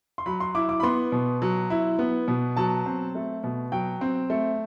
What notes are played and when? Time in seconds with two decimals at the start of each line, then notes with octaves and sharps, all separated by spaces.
0.18 C6
0.26 F#3 B5
0.40 C6
0.55 E4 D6
0.69 D6
0.80 B5
0.83 B3 C6
1.12 B2
1.42 F#3
1.70 E4
1.99 B3
2.28 B2
2.56 F#3 A5
2.86 C4
3.15 A3
3.44 B2
3.72 F#3 G5
4.01 C4
4.30 A3